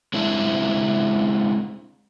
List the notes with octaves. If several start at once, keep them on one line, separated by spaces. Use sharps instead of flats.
G#3 C4 D4 E4